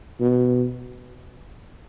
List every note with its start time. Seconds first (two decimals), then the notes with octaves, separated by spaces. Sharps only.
0.20 B2